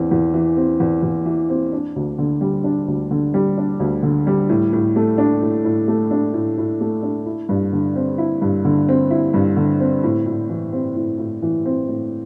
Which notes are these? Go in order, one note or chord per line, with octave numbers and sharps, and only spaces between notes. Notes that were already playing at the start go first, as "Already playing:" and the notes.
Already playing: E2 E3 C4
E2
E3
C4
E2
E2
E3
C4
D4
D2
D3
G3
D4
D2
D3
G3
D4
D2
D3
G3
A2
A2
A3
D4
A2
A2
A3
D4
A2
A2
A3
D4
E4
G2
D3
C4
E4
G2
D3
C4
E4
G2
D3
C4
A2
A2
E3
C4
A2
A2
E3
C4
A2